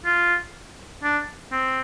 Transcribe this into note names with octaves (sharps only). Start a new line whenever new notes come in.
F4
D4
C4